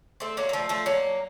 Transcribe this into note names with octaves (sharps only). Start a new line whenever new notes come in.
A3 C4
F#3 A#3
A#3
F3 A3
F3 A3
F#3 A#3